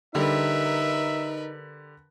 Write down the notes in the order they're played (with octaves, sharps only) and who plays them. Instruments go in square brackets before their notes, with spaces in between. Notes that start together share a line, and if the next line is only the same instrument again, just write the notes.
[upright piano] D3 G3 [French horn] D#4 [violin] A#4 B4 [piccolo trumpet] E5